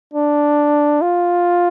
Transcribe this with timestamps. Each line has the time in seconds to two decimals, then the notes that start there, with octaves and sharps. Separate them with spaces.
0.14 D4
1.01 F4